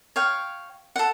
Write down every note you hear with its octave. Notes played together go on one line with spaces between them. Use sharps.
C#5 F5 G5
A4 F#5